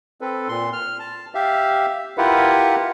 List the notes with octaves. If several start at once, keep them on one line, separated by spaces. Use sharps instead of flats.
C4 A4 B4
A#2 C6
F6
A5
G4 E5 F5
E4 F4 G4 A#4 B4 F#5